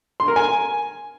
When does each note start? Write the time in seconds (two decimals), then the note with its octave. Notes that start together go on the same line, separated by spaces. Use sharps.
0.20 C6
0.28 A#4
0.36 G#5